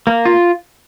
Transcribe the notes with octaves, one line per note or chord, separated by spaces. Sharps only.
A#3
F4